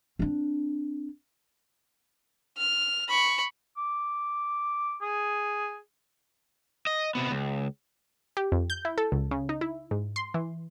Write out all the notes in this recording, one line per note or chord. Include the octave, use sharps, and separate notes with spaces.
C4 D4
F6
B5 C#6
D6
G#4
D#5
C3 B3
C#2
G4
F2
G6
E4
A4
C#2
C#3
D#4
E4
G#2
C6
E3